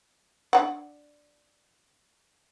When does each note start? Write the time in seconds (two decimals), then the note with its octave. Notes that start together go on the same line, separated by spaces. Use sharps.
0.53 D4 F#5